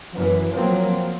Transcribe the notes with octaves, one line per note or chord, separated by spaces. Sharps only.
F#2 E3
F3 F#3 A#3 C4